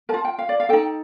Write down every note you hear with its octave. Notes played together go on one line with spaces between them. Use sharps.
F4 A#4 A5
G5
F5
D5
F5
D#4 A4 G5